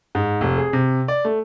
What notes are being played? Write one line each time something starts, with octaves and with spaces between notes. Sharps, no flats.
G#2
F1
G#4
C3
D5
A3